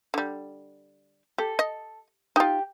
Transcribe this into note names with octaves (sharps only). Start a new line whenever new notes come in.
D3 G3
G4 A4
D#5
D#4 F4 G4